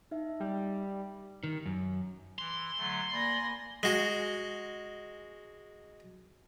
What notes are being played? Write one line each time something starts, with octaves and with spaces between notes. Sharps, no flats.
D#4 E5
G3
D#3
F#2
E3 C6
D3 F#3 A3
A#3 D5 G#5 B5 A#6
G#3 F#4